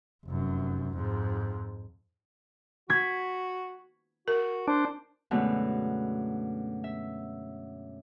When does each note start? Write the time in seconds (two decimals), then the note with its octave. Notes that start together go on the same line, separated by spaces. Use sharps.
0.25 F1 F#2
0.94 F2 G#2
2.90 F#4 G#6 B6
4.28 F#4 A#4
4.68 D4 C5
5.31 F#2 B2 D3 G#3 A3 B3
6.84 E5